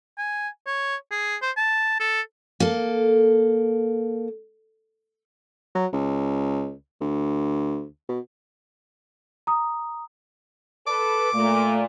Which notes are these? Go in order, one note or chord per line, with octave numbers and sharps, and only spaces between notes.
G#5
C#5
G#4
C5
A5
A4
A#3 A4
F#3
C#2
D2
B2
A#5 D#6
A4 B4 D6
A#2 A3